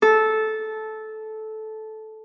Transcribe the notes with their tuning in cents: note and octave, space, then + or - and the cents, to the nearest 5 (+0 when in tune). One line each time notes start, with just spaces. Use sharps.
A4 -15